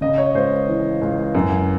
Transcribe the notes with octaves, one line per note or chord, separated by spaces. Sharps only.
C#3 D#5
C#5
C#2 C5
E3
C#2
F#2